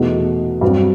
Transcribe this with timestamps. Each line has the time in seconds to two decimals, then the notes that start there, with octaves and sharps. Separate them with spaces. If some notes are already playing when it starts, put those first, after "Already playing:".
Already playing: E2 B2 A3 D#4
0.61 G2 F#3 C4